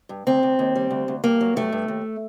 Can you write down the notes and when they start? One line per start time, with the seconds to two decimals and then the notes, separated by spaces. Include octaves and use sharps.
0.09 G2
0.27 D2 C4
0.43 D2
0.59 D#2
0.75 G3
0.91 D2
1.08 D2
1.24 G2 A#3
1.41 F#3
1.56 G2 A3
1.72 G2
1.88 D#2